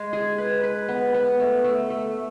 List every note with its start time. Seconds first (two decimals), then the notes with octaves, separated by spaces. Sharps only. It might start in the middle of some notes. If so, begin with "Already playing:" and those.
Already playing: G#3
0.13 G#4
0.38 B4
0.63 B4
0.88 B3
1.14 B3
1.39 A3
1.64 A3
1.90 A3